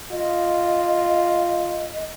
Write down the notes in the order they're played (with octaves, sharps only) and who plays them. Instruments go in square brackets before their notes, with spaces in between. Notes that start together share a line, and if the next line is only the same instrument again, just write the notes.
[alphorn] F4 [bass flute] D#5